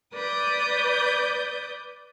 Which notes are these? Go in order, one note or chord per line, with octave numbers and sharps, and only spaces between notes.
B4 D5 D#6 G6